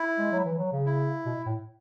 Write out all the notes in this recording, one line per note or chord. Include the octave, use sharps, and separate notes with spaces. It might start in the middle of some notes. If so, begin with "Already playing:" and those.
Already playing: E4
G#3
F#3
E3
F#3
C#3
E4
B2
A2